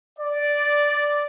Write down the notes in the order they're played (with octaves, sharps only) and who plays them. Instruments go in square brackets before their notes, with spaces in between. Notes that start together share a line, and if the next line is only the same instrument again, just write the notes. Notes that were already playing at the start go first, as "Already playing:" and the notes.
[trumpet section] D5